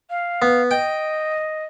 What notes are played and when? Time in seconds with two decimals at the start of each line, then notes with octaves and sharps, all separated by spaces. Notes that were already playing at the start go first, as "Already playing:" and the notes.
0.10 F5
0.42 B3
0.71 D#5 G5